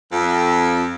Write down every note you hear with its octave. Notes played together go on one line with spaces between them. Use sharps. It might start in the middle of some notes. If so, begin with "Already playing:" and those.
F2